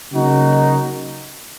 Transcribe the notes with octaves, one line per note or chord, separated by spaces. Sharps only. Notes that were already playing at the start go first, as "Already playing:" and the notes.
C#3 F#3 A#3 D#4 F#4